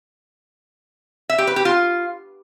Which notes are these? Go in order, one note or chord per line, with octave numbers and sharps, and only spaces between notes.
E5
G4
B4
G4
F4